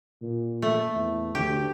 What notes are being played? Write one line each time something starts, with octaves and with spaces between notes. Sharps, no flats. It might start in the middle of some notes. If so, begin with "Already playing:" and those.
A#2
A3
E2
D2 G4